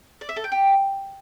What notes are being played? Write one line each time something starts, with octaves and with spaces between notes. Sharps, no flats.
D5
E5
A4
G5
G4